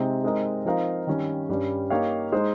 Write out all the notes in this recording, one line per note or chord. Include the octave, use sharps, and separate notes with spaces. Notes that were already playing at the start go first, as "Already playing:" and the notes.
Already playing: C3 G#3 C4 D#4
G#3 C4 D#4 A#4 D#5
F3 C4 D#4 A#4 F5
D#3 G3 C#4
G2 G3 C#4
A#3 D#4 G4 C#5 F5
G#3 D#4 G#4 C5